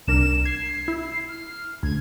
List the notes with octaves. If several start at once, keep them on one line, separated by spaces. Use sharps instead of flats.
C2 D4 A#4 E7
G#6 C7
E4
F6
D2 G#6